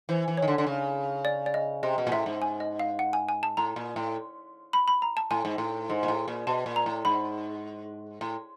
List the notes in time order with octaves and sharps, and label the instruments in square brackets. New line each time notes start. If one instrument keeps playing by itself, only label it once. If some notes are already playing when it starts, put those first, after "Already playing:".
[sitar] E3 [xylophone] C5
[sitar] E3
[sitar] D#3 [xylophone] C#5
[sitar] D3
D3
C#3
[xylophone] D5
D5
D#5
[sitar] C3 [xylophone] D#5
[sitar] B2
A#2
[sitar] A2 [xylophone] E5
[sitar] G#2
[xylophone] G#5
D#5
F5
F#5
G#5
G#5
A5
[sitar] A2 [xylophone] A#5
[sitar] A#2
A2
[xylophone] B5
B5
A#5
A5
[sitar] A2 [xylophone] G#5
[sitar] G#2
A2
G#2
A#2
A2
A#2
[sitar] B2 [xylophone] A5
[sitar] A#2
[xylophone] A#5
[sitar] A2
[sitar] G#2 [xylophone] B5
[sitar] A2